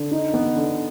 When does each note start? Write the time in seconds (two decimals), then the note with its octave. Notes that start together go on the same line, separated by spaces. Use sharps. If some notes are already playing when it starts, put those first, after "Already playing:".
Already playing: D3
0.11 D#4
0.34 B3
0.56 D3